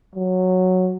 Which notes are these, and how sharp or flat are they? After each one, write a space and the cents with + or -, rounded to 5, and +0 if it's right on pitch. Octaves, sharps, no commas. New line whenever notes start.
F#3 -5